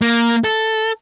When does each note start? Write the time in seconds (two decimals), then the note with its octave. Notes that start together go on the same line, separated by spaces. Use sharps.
0.02 A#3
0.44 A4